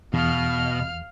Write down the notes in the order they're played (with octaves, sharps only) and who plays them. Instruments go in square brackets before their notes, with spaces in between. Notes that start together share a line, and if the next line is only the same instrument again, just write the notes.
[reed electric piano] E2 [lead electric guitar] B2 [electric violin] F5 F6